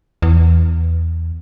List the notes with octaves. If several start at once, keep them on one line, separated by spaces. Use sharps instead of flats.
E2